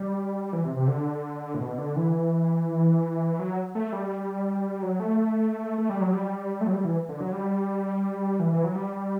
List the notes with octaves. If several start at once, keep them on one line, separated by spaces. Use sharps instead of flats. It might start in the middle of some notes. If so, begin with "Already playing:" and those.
Already playing: G3
E3
C3
C3
D3
A2
B2
D3
E3
F#3
A3
G3
F#3
A3
A3
G3
F#3
G3
A3
F#3
G3
E3
D3
F#3
G3
E3
E3
F#3
G3